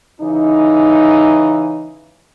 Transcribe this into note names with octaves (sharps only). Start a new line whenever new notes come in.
C#3 E3 D#4